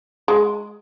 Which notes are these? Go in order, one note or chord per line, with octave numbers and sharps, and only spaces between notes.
G#3